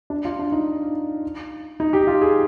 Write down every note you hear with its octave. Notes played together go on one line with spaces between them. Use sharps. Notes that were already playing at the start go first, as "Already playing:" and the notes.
D4
F4
D4
D#4
D#4
G4
F4
G#4